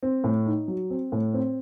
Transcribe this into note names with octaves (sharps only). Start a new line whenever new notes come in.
C4
A2
D#4
F#3
C4
A2
C4